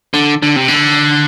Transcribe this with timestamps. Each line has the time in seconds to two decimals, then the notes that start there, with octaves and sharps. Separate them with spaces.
0.14 D3
0.42 D3
0.56 C3
0.68 D3